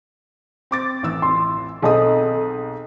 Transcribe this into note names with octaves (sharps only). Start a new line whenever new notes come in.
C4 D6 A6
A1 E3 E6
C6
B1 C4 G#4 A4 D#5 D#6